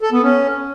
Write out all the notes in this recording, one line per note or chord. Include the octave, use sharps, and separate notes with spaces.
A4
B3
C#4